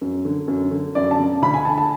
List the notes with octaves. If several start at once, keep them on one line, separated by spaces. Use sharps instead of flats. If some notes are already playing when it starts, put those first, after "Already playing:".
F#2
D3
F#2
D3
F#2 D5
A5
C#3
D2 B5
G#5
D3 A5
A5